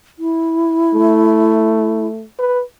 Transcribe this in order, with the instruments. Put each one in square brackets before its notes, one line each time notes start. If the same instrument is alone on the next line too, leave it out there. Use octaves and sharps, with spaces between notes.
[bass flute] E4
[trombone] A3
B4